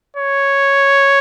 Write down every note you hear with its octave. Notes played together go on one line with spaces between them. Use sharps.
C#5